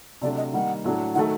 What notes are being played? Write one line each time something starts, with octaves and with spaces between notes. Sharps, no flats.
C3 F#3 A3 D4 D5
D#5
D#3 G3 A#3 D#4 F#5
A2 F#3 A3 D4
D#3 F#3 A3 F#5